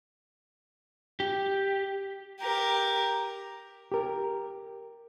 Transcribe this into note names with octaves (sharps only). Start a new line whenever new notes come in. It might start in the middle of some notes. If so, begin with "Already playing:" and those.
G4
G4 A#4
G4 A#4